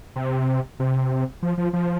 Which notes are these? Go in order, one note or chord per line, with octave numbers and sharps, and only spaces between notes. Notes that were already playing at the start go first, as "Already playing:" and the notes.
C3
C3
F3
F3
F3